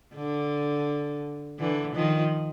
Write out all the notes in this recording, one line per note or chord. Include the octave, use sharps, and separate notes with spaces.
D3
D3 E3
D#3 F3